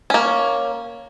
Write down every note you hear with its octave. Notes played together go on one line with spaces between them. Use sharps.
A#3 C#4